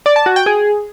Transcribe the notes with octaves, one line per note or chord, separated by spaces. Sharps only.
D5
A5
F#4
G5
G#4